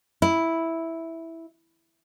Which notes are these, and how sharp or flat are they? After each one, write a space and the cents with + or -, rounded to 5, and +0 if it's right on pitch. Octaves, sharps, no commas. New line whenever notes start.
E4 -5